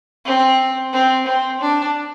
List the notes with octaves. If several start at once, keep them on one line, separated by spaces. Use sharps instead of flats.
C4
C4
C4
D4